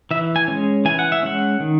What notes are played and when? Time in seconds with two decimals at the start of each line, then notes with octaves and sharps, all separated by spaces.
0.11 E3 E5
0.36 G#5
0.48 G#3 C#4
0.85 E3 G#5
0.99 F#5
1.12 E5
1.23 G#3 C#4 F#5
1.60 D#3